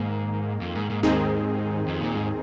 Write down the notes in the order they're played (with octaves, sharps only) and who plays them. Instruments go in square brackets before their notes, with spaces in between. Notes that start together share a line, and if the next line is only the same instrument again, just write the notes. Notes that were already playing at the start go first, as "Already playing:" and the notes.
Already playing: [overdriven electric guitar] G#2 [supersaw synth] D#3 A#3
[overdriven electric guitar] F2
G#2
G#2
[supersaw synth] D#2 D#3 C4 D#4 G#4 [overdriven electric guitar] G#2
[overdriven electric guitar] F2
A#2
G#2